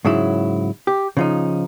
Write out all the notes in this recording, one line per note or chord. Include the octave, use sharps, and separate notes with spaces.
G#2 C#3 F#3 E4
G4
C#3 F3 D#4